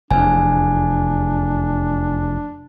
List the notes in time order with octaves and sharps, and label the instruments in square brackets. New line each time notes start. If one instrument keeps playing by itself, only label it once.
[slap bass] F1 E2 [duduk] D4 [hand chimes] G#5